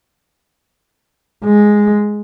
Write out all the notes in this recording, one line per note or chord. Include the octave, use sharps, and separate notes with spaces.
G#3